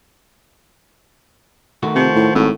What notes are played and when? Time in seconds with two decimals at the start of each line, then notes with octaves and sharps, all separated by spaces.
1.83 D#3 A3 F#4
1.95 C3 F3
2.15 A2
2.35 G#1 A2